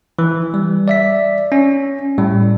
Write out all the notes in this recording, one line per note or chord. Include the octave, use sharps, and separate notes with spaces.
E3
G3
D5 E5 B6
C#4
A2 G3